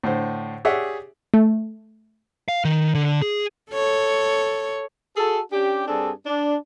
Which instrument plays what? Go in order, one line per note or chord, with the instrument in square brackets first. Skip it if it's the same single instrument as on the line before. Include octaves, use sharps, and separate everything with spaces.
[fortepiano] A2 D3 C5
G4 G#4 C#5 D5 E5 F#5
[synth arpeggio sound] A3
[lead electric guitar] F5
D#3
D3
G#4
[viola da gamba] A4 C#5
[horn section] F#4 G#4 A4
C#4 D4 G4
G2 C4 D4 G#4 A4
D4